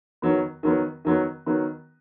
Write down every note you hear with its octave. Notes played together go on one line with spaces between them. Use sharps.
D#3 F#3 B3
D#3 F#3 B3
D#3 F#3 B3
D#3 F#3 B3